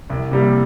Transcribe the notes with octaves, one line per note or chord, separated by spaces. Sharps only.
C2
C3 G3 A#3